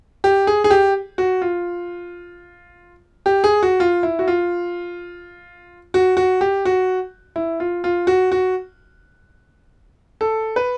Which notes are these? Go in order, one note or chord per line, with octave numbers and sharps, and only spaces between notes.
G4
G#4
G#4
G4
F#4
F4
G4
G#4
F#4
F4
E4
F#4
F4
F#4
F#4
G4
F#4
E4
F4
F4
F#4
F#4
A4
B4